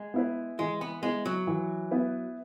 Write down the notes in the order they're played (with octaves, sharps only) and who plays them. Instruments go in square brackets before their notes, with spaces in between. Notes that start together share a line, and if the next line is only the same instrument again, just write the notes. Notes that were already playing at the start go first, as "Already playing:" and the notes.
Already playing: [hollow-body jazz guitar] G#3
[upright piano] B3 E4 B4
[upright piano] E3 [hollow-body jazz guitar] G#3
[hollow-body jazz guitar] B3
[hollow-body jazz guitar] G#3 [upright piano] B3 E4 B4
[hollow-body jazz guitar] F#3
[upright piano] E3
B3 E4 B4